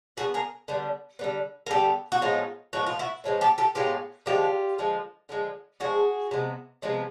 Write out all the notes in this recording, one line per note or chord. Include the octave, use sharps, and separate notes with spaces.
D3 G3 B3 F#4 G#4
G#4 A#4
D3 G3 B3
D3 G3 B3
A#4
D3 G3 B3 G4 A4
F#4
A2 F3 G#3 B3 D#4 F4
A2 F3 G#3 B3 F#4
F4
E4 F#4
A2 F3 G#3 B3
G4 A4
G4 A4
A2 F3 G#3 B3 F4 G4
D3 F3 G#3 F4 G4
D3 F3 G#3
D3 F3 G#3
D3 F3 G#3 F#4 G#4
C3 F3 G#3 B3
C3 F3 G#3 B3